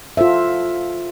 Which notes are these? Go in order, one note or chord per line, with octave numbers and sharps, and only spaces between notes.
F4 A4 C5 E5